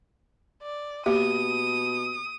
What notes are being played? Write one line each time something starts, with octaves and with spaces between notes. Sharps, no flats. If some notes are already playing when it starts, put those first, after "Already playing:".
D5
B2 A#3 G4 D#6